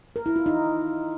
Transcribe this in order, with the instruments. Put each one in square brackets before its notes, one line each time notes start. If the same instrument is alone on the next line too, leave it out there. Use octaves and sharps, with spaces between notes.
[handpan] A#4
E4
F4
D#4